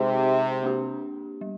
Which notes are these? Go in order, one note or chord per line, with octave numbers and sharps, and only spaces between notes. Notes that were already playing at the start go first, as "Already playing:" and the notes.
Already playing: C3 G#3 D#4 G#4 C5
A#3 D4 G4
G3